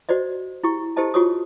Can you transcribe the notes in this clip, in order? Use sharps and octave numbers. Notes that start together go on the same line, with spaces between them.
F#4 C5 D5 D#5
E4 G4 C#6
E4 G4 A4 C5 D#5 A5
F4 F#4 G#4 C#5 C#6 D#6